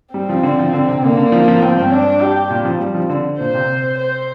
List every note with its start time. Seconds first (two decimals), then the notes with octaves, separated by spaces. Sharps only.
0.14 G3 C4
0.29 F3
0.43 D3
0.59 F3
0.73 D3
0.89 C3
1.03 D3 A#3
1.17 D3
1.32 F3
1.48 F3
1.62 F3 C4
1.77 G2
1.92 D4
2.21 G4
2.50 A#2
2.65 F3
2.80 G3
2.95 F3
3.09 D3
3.40 A#2 C5
3.55 C3
3.98 C5